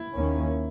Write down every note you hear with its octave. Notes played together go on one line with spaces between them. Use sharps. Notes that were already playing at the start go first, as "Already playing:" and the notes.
Already playing: E4
D#2 D#3 A#3 C#4